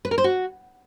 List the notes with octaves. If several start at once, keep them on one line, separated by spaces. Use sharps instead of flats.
B4
A#4
C5
F#4